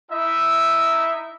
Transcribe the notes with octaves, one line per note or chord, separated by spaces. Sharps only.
D#4 E4 D#5 E5